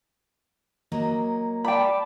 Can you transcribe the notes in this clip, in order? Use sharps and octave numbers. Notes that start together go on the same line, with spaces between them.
F#3 A#3 D#5
D5 G5 A5 B5 D6